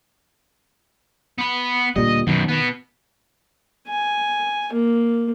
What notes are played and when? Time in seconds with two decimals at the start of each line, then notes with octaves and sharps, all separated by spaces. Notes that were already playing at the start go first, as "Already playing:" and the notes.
1.39 B3 B5
1.96 D2 A#2 G3 D#5
2.27 F#2 B2 D#3
2.48 B2 B3
3.88 G#5
4.73 A#3